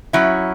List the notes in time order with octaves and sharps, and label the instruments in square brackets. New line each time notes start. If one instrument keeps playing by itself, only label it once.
[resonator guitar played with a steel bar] F#3 C#4 E4